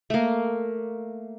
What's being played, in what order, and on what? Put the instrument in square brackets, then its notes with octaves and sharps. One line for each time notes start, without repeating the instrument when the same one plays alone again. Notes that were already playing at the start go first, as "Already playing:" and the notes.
[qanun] A3 A#3